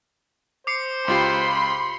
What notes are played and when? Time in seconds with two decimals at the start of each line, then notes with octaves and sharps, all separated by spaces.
0.67 C5 D6 C7 C#7
1.08 C#2 F4 G4 B5 C6